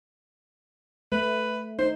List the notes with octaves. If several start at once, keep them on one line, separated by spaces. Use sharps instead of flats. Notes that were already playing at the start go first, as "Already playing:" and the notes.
A3 B4
D#4 C5